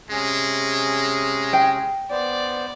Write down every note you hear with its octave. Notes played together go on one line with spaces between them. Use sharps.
C3 G#3 C#4 G#4
G5
B3 C5 D5